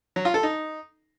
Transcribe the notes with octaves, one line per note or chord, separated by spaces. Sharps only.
F#3
F4
A4
D#4